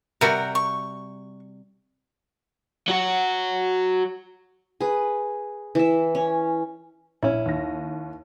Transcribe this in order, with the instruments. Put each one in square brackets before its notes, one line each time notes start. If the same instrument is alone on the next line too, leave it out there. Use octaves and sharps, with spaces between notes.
[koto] C3 G3 F#4 [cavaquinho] A#4
[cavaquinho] C#6
[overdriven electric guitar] F#3 F#4
[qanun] G#4 B4
E3 E5
C#4
[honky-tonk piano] A#1 [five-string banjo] C#4 E4
[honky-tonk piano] D#2 A#6